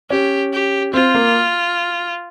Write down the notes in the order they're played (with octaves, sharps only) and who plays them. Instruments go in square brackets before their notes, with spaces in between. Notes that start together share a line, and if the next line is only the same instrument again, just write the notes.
[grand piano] C#4 [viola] G4
[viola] G4
[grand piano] C4 [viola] F4
[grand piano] A#3